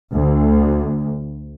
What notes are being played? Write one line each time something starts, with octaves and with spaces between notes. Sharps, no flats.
D2